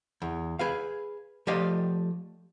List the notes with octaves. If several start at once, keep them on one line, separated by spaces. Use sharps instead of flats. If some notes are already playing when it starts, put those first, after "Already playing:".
E2
G#4 B4 F5
F3 A3 G4 D5 D#5 F5